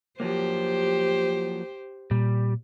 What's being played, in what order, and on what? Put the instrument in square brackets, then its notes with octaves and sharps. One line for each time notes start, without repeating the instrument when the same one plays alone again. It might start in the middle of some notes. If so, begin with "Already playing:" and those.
[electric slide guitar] F3 F#3 A#3 [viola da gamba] G4 C5
[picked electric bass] A#2 [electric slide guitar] G3